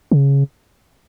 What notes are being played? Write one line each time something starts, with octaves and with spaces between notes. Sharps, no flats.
C#3